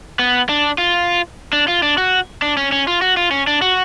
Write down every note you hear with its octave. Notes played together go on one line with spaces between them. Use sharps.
B3
D4
F4
D4
F4
D4
F#4
D4
C#4
C#4
F4
F#4
F4
C#4
D4
F#4